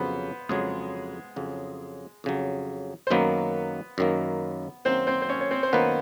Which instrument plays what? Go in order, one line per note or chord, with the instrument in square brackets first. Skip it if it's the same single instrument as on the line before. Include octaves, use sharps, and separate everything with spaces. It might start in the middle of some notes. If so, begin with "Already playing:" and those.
Already playing: [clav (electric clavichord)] F2 C#3 F#3 [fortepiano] B3 B4 C5
[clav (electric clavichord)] F2 C#3 F#3 [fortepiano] G#3 G#4
[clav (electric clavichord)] F2 C#3 F#3
F2 C#3 F#3
[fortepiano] C5
[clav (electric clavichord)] F#2 D#3 F#3 A#3 [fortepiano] B3 B4
[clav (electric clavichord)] F#2 D#3 F#3 A#3
[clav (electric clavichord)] F#2 D#3 F#3 A#3 [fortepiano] C4 C5
[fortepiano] C4 C5
C5
C#4 C#5
C#5
C4 C5
C5
[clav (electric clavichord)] F#2 D#3 F#3 A#3 [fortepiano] B3 B4